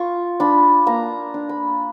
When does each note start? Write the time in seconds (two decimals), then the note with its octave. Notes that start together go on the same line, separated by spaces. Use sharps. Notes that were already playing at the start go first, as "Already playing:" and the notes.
Already playing: F4 C#6
0.40 D4 B5
0.87 A#3 A#5
1.34 D4
1.49 B5